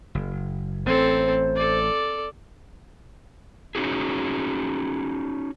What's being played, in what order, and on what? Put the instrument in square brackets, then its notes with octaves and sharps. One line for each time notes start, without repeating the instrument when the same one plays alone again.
[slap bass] F#1
[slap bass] A1 [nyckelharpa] C4 A4 [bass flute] C5
[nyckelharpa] A4 D5
[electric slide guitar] C#4 D#4 F#4 G#4